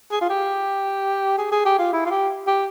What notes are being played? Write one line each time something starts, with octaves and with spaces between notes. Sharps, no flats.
G#4
F4
G4
G#4
G#4
G4
F4
E4
F4
G4
G4